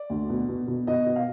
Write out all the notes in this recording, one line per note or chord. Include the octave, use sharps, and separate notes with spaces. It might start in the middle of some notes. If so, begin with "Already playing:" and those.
Already playing: D5
D2
B2
B2
B2
B2 D#5
B2
F5